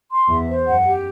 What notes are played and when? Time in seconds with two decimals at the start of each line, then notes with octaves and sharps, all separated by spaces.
0.11 C6
0.29 E2 E5
0.47 C5
0.65 F#2 F#5
0.84 G4